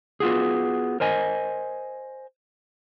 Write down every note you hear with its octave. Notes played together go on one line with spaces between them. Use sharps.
B3 F4 F#4 G#4
A#4 C5 D#5 G#5